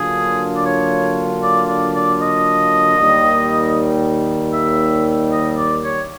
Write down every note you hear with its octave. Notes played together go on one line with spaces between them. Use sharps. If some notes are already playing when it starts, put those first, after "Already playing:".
Already playing: D3 F#3 A#3 D4 F4 G#4
D5
C#5
D5
D5
D5
D#5
D#2 D#3 G3
E5
D#5
D5
C#5